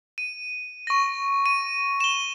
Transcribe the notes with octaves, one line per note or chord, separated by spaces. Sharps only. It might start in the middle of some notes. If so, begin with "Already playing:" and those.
D#7
C#6 A#6
D#7
E7 G7